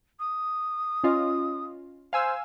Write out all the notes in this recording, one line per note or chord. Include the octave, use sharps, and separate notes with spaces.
D#6
C#4 F4 D#5
C5 F5 G#5 E6